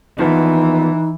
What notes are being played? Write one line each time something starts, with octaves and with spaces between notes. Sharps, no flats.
D#2 E3 F3 B3 D#4